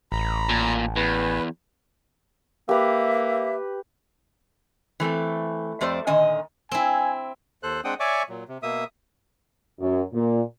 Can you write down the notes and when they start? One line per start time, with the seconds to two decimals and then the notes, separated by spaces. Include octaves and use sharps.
0.12 A1 A#5 B5
0.49 A#2
0.96 E2 B4
2.69 A#3 G4 B4 E5
5.00 E3 A3 C4 A4
5.81 F2 A3 G4 C5 D5
6.07 A#2 D3 D#3 D#5 G#5
6.72 C4 E4 G#5
7.63 D#2 A4 C5 F#6
7.84 G#3 C4 D4 F#5 G5 D#6
8.00 C#5 D5 E5 G#5 C#6 D6
8.29 A#2 F#3
8.48 C3
8.63 B2 A#3 E5 D#6
9.80 F#2
10.13 A#2